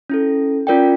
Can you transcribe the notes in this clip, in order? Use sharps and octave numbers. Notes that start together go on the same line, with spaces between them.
C#4 E4 A4
C#4 F4 A#4 D5 G5